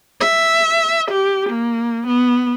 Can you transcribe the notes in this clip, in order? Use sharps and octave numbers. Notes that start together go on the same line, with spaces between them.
E5
G4
A#3
B3